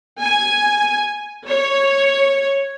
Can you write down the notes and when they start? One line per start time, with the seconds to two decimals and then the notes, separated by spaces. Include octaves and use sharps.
0.20 G#5
1.47 C#5